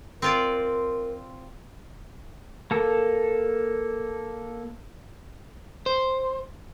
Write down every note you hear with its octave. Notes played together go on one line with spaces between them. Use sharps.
C4 F4 A#4 D5
A#3 A4
C5